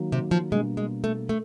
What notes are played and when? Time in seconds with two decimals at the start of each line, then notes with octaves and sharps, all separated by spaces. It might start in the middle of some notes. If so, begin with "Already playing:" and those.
Already playing: D#3 F#3 A#3
0.12 C3
0.31 F3
0.52 B2 G3 G#3 A#3 D4
0.77 G#3
1.04 A3
1.29 A3